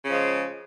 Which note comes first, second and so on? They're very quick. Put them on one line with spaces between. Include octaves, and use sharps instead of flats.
C#3 F3 G#3